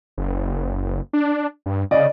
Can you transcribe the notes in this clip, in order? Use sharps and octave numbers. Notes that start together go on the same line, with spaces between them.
F#1
D4
G2
C#3 D5 D#5